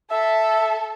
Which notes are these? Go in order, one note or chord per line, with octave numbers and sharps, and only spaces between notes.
A4 E5